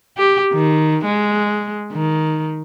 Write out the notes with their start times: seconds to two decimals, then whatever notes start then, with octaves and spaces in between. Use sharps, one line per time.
0.17 G4
0.52 D#3
1.05 G#3
1.92 D#3